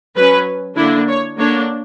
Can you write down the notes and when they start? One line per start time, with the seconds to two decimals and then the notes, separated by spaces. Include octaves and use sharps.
0.15 F#3 C#4 B4
0.77 D3 A#3 D4 E4
1.08 C#5
1.38 D3 A#3 D4 C#5